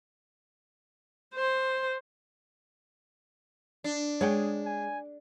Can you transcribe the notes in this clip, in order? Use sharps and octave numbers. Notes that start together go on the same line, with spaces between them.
C5
D4
G#3 G#4 C#5 F#5 G5
G#5